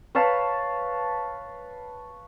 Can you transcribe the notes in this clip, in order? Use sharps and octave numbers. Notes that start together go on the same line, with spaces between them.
B4 C#5 F5 A5